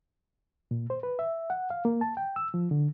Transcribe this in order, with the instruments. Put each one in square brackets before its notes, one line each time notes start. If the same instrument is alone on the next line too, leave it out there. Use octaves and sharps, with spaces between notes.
[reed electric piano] A#2
C5
B4
E5
F#5
F5
A#3
A5
G5
E6
F3
D3